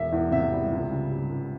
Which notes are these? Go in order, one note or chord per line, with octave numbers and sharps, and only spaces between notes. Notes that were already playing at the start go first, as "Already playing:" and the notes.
Already playing: E1 E5
E2
C3 E5
G3
C#2
C#3
G3
C#2